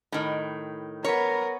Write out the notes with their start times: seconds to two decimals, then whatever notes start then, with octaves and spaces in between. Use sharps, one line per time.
0.12 A2 D#3
1.04 B3 A#4 C#5